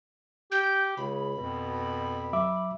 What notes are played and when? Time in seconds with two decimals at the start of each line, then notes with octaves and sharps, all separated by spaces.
0.52 G4 G6
0.97 C#2 C#3 B5
1.38 F2 B2
2.33 F#3 E5 D6